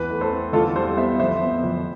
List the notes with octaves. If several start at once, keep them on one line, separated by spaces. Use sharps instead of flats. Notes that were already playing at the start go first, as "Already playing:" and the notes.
Already playing: E2 B4
A3
A4 C5
C4
E2 F4 A4
G3 A4 C5
B3 C5 E5
F2 C5 E5
B3
F2